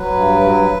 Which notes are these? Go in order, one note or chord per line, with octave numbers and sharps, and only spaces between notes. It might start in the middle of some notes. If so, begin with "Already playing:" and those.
Already playing: F#3 B4
G2
F#3